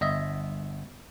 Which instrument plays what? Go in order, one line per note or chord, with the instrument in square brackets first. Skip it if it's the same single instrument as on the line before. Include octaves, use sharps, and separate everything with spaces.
[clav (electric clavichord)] G1 D#5 E5